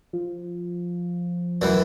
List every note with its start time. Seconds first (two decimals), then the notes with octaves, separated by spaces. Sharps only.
0.13 F3
1.62 F#2 E3